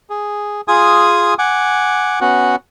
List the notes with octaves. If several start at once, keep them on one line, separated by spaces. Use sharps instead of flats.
G#4
F4 G#4 G#5 D#6
F#5 G#5 D6
B3 C#4 F#4 F#5